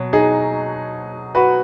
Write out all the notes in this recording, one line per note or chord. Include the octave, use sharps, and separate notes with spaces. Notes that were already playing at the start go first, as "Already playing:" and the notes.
Already playing: B2 F#3
D#4 G#4
F#4 B4